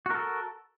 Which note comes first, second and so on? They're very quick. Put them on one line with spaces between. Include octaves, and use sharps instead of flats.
F#4 A#4 A4